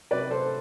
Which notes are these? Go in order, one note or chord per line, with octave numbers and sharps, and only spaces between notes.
C3 F#3 B4 D5
A4 C5